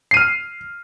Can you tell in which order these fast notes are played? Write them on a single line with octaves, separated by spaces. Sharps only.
C7 D#7 F6